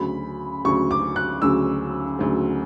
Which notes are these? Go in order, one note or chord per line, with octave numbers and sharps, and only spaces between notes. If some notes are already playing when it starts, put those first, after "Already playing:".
Already playing: D2 C#3 F#3 B5
D2 C#3 F#3 C#6
D6
F#6
D2 C#3 F#3 E6
D2 C#3 F#3